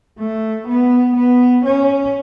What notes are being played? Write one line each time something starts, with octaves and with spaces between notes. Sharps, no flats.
A3
B3
B3
C#4